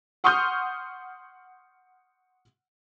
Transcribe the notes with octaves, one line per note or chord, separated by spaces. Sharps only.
F#5 C6 C#6 D#6 F6 G6